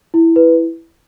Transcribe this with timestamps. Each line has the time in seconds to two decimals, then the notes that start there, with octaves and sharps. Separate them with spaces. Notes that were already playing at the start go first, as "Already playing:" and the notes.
0.14 E4
0.36 B4